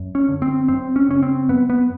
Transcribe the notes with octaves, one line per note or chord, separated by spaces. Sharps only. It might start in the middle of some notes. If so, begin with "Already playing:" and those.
Already playing: F#2
C#4
D3
C4
F#2 C4
C#4
C#3 C#4
C4
F#2 B3
B3